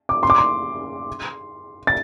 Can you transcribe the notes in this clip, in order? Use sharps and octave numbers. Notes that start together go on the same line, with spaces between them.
D6
C6
D6
C6
A6